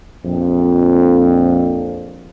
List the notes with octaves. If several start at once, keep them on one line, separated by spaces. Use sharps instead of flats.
A#1 F2